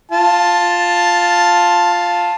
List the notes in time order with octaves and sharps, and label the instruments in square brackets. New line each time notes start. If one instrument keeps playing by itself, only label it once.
[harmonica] F4 A5